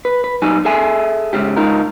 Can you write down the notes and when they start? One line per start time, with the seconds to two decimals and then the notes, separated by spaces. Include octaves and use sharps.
0.05 B4
0.24 B4
0.42 A#2 F#3 G3 D#4 G#5
0.65 G#4 A4 E5 G#5
1.33 G#2 C#3 C#4 G4
1.56 C#2 G#2 D#4 F4 A#4